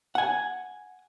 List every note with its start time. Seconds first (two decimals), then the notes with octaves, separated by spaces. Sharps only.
0.15 F#5 G#5